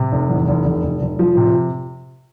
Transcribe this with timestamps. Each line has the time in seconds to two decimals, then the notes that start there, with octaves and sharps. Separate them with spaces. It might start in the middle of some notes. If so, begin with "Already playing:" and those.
Already playing: C3
0.12 F1
0.29 E2
0.48 F1
0.66 F1
0.83 F1
1.01 F1
1.19 F3
1.37 C3